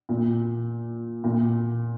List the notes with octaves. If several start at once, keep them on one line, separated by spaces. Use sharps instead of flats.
A#2
A#2